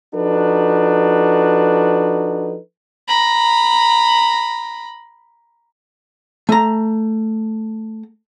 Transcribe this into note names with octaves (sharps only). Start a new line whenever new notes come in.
F3 D4 D#4 F#4 A4 B4
A#5 B5
A3 A#5